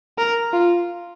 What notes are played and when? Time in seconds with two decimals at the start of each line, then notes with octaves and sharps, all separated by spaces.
0.18 A#4
0.53 F4